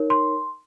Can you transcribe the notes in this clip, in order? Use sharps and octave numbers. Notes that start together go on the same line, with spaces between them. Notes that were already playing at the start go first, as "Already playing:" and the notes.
Already playing: D#4 A#4 C#5
C6